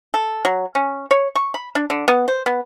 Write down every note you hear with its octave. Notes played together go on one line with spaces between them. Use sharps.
A4
F#3
C#4
C#5
C#6
B5
D4
D3
B3
C5
B3